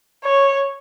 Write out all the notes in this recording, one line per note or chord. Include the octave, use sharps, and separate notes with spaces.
C#5